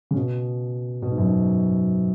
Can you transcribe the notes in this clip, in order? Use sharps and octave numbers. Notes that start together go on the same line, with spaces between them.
C#3
B2
B2
G#2
F#2
G#2